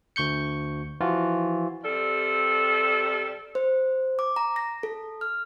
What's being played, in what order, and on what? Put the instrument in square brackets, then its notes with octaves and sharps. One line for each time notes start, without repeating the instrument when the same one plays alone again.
[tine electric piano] D2 C#6 G6 C#7
E3 F3 F4 F#4
[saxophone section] C3 G3 A4
[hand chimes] C5
D6
A#5
A#6
A4
F6